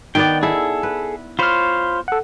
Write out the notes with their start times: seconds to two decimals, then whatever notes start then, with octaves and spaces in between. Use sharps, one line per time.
0.15 D#3 B3 D5 G5
0.43 E4 G#4 A4
0.83 B4
1.39 F4 C5 C#5 B5 F6
2.08 A4 F#5